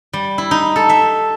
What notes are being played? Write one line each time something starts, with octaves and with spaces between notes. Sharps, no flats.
G3
E4
D#4
A4
E5